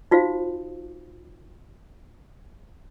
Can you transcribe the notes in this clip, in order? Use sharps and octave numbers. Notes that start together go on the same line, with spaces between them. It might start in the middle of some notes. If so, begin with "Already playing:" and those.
D#4 F4 F#4 C5 F5